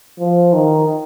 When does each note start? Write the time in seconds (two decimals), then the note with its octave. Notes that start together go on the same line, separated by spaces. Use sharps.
0.19 F3
0.53 D#3